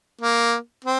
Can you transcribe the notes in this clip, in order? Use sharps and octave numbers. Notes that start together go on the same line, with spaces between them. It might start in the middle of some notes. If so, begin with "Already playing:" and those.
A#3
C4